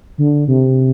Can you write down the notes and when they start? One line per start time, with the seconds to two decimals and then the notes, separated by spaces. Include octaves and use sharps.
0.18 D3
0.48 C3